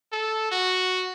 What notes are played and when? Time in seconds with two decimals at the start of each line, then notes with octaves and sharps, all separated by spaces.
0.12 A4
0.52 F#4